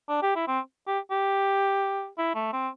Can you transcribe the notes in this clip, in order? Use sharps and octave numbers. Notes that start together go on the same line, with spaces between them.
D4
G4
E4
C4
G4
G4
E4
A3
C4